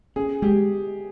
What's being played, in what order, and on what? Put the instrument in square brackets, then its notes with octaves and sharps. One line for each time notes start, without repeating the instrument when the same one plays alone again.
[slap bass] C#4 [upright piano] G#4
[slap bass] G#3 [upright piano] G4